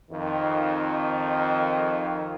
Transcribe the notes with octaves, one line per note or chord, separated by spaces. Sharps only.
F2 D#3